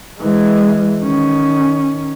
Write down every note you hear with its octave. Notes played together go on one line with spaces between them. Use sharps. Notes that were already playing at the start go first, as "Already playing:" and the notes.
E3 G#3
D#3 C#4